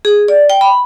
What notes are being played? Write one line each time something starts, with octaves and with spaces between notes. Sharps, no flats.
G#4
D5
G5
B5